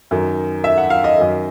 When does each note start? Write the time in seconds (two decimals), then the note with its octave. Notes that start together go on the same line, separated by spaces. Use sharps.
0.11 F#2 D#3
0.64 E5
0.78 F#5
0.90 F5
1.04 D#5
1.17 F#2 D#3